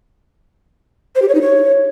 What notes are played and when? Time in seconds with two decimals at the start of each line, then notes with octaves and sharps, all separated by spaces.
1.16 C5
1.22 G4
1.28 C#5
1.35 D#4
1.41 C#5